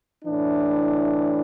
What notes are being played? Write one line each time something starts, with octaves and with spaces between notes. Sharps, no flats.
A2 E3 D4